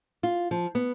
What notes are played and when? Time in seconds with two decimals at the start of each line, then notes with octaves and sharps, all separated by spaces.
0.23 F4
0.51 F3
0.75 B3